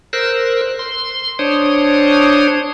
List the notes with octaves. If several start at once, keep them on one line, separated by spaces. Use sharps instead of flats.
A#4 C5 E6 F#6
C6
D4 C5 C#5 D#6